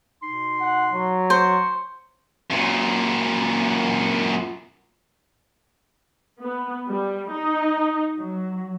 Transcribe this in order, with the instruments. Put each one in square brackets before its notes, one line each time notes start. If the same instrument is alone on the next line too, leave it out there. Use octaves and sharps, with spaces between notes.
[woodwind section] B2 D#4 C6
[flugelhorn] F#5
F#3
[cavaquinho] C5 [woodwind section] C#6
[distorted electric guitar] F#2 A#2
[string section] B3
G3
D#4
F#3